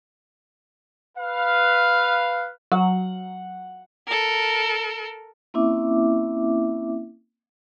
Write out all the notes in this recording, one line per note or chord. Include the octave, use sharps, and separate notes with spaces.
B4 F5
F#3 F#5
A4 A#4
A#3 C4 C#4 E4 E5 D6